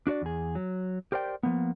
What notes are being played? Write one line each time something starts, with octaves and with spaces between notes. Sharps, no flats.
D4 F#4 C#5 D5
E2 G#4
F#3
G4 A#4 C5 D5 G5
F3 A#3 B3